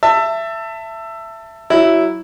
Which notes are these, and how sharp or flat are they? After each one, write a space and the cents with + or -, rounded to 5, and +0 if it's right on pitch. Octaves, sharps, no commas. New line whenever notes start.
E5 +15 A5 +25
F#3 +20 E4 +0